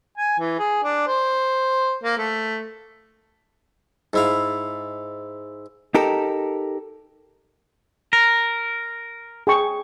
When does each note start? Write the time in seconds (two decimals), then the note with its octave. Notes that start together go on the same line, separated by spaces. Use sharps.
0.17 G#5
0.39 E3
0.59 G#4
0.84 D4
1.07 C5
2.03 A#3
2.18 A3
4.13 G#2 E4 F5
5.95 D#4 G4 A4 A#4
8.13 A#4
9.47 G#4 G5 C#6